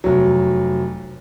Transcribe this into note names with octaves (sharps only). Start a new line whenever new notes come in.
F1 F#3